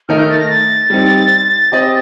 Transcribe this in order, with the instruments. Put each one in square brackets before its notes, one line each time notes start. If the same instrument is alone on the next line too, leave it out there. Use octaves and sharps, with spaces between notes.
[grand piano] D#3 A3 D#4 A#4 D#5 [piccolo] F6
[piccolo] G6
A6
A#6
A6
[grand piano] G3 C4 D#4
C4 G4 C5 D#5